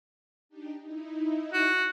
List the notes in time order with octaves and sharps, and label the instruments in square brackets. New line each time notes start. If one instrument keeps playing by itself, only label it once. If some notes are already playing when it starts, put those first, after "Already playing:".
[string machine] D4 D#4 G4
D#4 E4
[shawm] F#4